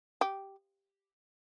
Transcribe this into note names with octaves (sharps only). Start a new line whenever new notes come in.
G4